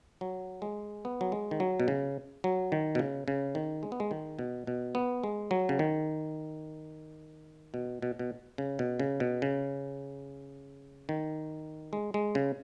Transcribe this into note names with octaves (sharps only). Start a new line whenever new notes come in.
F#3
G#3
B3
F#3
G#3
D#3
F#3
B2
C#3
F#3
D#3
B2
C#3
C#3
D#3
G#3
B3
G#3
D#3
B2
B2
B3
G#3
F#3
C#3
D#3
B2
B2
B2
C#3
B2
C#3
B2
C#3
D#3
G#3
G#3
C#3